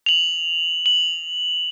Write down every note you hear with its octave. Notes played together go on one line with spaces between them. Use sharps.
F7 F#7
F#7